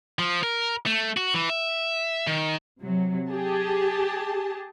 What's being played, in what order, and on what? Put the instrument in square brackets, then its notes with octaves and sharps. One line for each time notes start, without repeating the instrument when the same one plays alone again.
[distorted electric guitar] F3
A#4
A3
F#4
E3
E5
D#3
[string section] C3 F#3
G4 G#4 A5